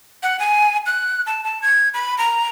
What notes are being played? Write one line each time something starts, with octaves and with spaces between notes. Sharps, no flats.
F#5
G#5
F#6
A5
A5
G#6
B5
A#5